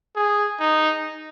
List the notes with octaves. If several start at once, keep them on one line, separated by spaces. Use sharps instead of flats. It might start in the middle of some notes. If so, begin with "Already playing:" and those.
G#4
D#4